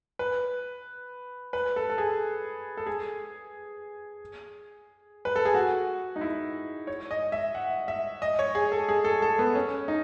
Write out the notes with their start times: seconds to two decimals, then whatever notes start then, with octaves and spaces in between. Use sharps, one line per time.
0.19 B4
1.53 B4
1.76 A4
1.90 A4
1.98 G#4
2.77 A4
2.87 G#4
5.25 B4
5.36 A4
5.45 G#4
5.54 F#4
6.16 D#4
6.21 E4
6.87 C#5
7.11 D#5
7.32 E5
7.55 F#5
7.88 E5
8.22 D#5
8.39 C#5
8.55 G#4
8.72 A4
8.89 G#4
9.04 A4
9.22 A4
9.39 B3
9.55 C#4
9.88 D#4